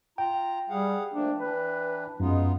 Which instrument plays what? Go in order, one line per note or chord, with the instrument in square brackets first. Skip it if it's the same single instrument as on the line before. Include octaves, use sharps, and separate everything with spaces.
[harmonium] F4 A#5 [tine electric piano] G5
[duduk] G3 [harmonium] G#4 F5 F#5
[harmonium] F3 A3 A#3 [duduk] D4
[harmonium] E3 D4 [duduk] B4
[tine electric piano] F#2 [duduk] G#3 [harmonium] B3 D#4 F4